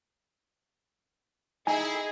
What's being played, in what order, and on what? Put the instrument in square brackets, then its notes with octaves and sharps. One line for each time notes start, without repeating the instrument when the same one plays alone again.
[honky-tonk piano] D#4 [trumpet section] E4 [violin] G#4 [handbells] G#5